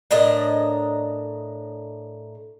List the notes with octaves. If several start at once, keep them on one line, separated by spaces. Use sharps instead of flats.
A2 D4 A#4 D#5